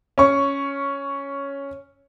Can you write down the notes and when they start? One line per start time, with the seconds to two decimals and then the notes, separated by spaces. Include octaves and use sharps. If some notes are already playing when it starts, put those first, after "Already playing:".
0.18 C#4 C#6